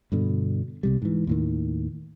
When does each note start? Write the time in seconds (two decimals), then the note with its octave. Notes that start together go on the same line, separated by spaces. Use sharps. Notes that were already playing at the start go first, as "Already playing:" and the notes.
0.12 G2 B2 D3
0.83 C2 C3 G3
1.02 G#2 E3
1.27 D#2 A2 D#3